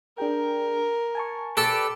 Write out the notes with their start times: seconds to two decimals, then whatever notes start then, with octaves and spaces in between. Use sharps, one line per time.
0.18 D4 G#4 A#4 G5
1.15 G#5 A5 C#6
1.57 G4 A4 B4 D5